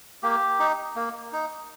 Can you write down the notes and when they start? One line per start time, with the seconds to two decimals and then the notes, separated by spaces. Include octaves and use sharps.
0.23 A#3 G4
0.59 D#4
0.96 A#3
1.33 D#4